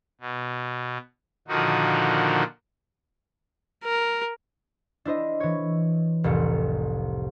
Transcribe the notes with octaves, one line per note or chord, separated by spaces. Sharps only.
B2
A#2 D3 D#3 F3 D#4 F#4
A#4
D4 E4 C5 D#5
E3 C#5
F1 C2 A2 C#7